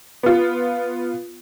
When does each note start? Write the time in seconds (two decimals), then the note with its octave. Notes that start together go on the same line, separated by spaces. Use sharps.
0.23 B3 F4